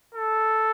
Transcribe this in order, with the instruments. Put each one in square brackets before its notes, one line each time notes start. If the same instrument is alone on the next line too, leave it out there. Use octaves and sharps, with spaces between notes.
[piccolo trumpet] A4